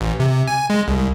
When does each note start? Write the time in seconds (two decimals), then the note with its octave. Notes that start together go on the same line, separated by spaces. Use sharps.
0.01 A1
0.20 C3
0.47 G#5
0.70 G#3
0.88 C2